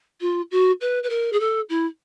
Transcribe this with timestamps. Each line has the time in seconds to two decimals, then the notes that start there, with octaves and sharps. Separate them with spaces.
0.21 F4
0.51 F#4
0.81 B4
1.03 B4
1.09 A#4
1.33 G#4
1.40 A4
1.69 E4